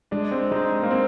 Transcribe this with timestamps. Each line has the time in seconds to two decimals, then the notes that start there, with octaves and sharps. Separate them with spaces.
0.12 G#3 D4
0.32 C4
0.51 G#3 D#4
0.83 A#3
0.91 C4